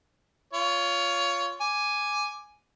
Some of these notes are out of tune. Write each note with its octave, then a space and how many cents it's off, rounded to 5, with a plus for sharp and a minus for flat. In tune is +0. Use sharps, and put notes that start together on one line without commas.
F4 +0 C#5 +20
G#5 +0 D6 +0